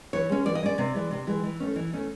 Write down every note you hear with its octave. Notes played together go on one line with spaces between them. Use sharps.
E3 C#5
G#3 C#4
E3 D5
D#5
G#3 C#4 D5
C3
E3 G#3
C3
E3 G#3
E3
A3 C#4
E3
A3 C#4